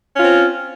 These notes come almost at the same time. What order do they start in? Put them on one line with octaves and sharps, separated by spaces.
C#4 F4 C4